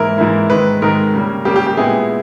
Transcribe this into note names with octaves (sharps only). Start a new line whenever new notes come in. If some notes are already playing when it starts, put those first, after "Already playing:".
Already playing: G#2 E3 A#3 E4 A#4
G#2 E3 A#3 E4
G#2 D#3 G#3 B4
G#2 D#3 G#3 A#4
C#3 G3 A#3
C#3 G3 A#3 G4
G4
G4
A#2 G#3 B3 E4 G#4